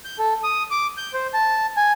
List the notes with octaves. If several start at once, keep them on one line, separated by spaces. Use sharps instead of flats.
G6
A4
D#6
D6
G6
C5
A5
G#5